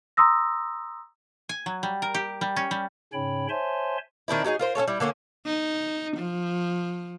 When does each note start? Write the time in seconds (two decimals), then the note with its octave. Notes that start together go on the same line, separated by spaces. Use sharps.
0.17 A#5 C6 D#6 E6 A#6
1.49 G#5
1.66 F#3
1.83 G3
2.02 A#4
2.14 G4
2.41 G3
2.56 C#4
2.71 G3
3.13 G#2 C#3 C#4 C#5 G5 B5
3.49 C5 C#5 E5 G#5 A5 C6
4.28 D#3 C4 D4 E4
4.44 F#3 A3 D#4 G#4
4.59 F4 A#4 C5
4.75 C#4 F4 A4 C#5
4.87 G3 E4
5.00 D3 A#3 C#4 A4
5.46 D#4
6.17 F3